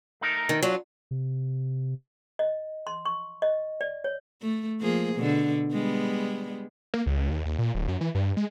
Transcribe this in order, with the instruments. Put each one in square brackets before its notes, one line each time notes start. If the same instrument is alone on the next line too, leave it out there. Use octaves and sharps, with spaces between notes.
[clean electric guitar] A3 D#4 A#4
[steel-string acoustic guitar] D#3
F#3 D4 F4
[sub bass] C3
[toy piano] D#5
C6
C#6
D#5
D5
C#5
[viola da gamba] A3
F3 A#3 G#4
B2 D3
G3 G#3 B3
[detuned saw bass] A#3
C#2
D#2
D#2
A#2
D1
F#2
E3
G2
G#3